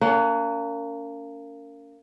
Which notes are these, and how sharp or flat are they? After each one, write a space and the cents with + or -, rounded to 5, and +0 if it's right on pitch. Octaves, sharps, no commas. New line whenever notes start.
A#3 -20 C#4 +40 F#5 +10